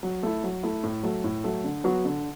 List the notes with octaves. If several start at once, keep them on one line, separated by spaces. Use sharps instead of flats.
F#3
A3 E4
F#3
A3 E4
A2
F#3 A3
A2
F#3 A3
D3
F#3 B3 F#4
D3